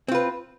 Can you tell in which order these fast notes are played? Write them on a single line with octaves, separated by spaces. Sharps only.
C4 F4 B4